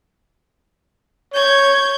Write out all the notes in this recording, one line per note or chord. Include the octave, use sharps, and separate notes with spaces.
C#5 G6 G#6